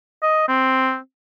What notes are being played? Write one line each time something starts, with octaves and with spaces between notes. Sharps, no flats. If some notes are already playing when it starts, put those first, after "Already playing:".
D#5
C4